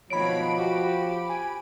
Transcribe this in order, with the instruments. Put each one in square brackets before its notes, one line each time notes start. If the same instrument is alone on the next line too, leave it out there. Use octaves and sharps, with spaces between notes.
[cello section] B2 D#3 [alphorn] F3 [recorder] C#5 [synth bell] B5 D7
[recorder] F#4 [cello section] G4
[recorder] G#5